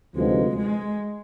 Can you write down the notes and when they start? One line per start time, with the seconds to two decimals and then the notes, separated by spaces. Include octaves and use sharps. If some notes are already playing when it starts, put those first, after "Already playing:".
0.14 D2 C3 F3 G#3 B3 D#4
0.55 G#3